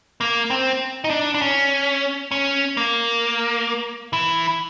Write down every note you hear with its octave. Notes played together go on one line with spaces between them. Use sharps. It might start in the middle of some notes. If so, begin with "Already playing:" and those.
A#3
C4
D#4
D4
D4
C#4
C#4
A#3
E3